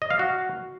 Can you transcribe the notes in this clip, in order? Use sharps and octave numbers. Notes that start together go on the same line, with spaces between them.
D#5
F5
F#4